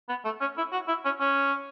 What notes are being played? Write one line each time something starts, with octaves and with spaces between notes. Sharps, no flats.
B3
A3
C#4
E4
F#4
E4
C#4
C#4